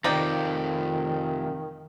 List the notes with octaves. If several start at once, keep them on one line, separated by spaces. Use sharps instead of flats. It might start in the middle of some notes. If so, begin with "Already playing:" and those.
F2 C3 D#3 D#4 D5 G5